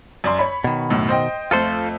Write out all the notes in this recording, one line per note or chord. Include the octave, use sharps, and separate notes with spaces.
F#2 D5 C6
C#5 B5
B2 D#3
F#2 A2
C5 D#5 G5
F2 A3 F4 A4 C5